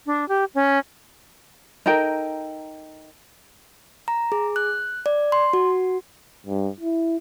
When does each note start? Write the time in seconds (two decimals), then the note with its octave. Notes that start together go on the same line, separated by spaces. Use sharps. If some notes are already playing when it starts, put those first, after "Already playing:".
0.06 D4
0.29 G4
0.55 C#4
1.86 D#4 A4 A#4 G5
4.08 A#5
4.32 G#4
4.56 F#6
5.06 D5
5.32 C6
5.53 F#4
6.46 G2
6.80 E4